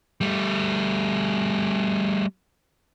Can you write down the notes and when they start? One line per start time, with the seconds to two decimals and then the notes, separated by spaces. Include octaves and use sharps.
0.21 G3 A3